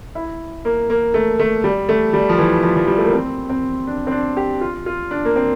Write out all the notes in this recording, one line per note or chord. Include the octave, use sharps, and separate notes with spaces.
E4
A#3
A#3
A3
A3
G3
A3
G3
F3
E3
F3
F3
G3
A3
A#3
C4
C4
D4
C4
D4
G4
F4
F4
D4
A#3
C4